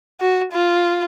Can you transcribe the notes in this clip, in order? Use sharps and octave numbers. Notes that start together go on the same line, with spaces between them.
F#4
F4